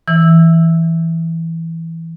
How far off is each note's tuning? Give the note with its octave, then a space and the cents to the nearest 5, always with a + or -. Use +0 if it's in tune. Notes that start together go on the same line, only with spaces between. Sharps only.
E3 -5 E5 +0 E6 +0